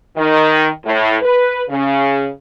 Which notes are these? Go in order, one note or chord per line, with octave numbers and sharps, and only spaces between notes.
D#3
A2
B4
C#3